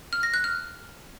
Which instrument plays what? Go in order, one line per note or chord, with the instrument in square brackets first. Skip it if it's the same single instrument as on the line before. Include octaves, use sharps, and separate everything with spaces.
[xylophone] F6
A#6
F#6
F6